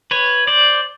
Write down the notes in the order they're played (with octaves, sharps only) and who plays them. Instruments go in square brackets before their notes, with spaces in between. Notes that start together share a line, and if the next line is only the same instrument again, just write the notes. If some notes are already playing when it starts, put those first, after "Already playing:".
[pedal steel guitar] B4 C#5
C5 D5